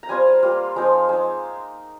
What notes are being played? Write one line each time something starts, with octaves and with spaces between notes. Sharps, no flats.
A#5
G3 C4 F4 G#5
G3 A#3 F4
F3 G#3 C4 D#4
G#3 D#4